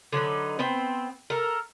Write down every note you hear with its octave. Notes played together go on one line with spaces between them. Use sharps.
D3 F#3 D#4 B4
B3 C4 G5
A4 A#4